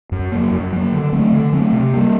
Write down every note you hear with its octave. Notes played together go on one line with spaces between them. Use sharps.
F#2
F#3 A#3
F#2
F#3 A#3
D3
F#3 A3 C4
D3
F#3 A3 C4
C3
G3 A#3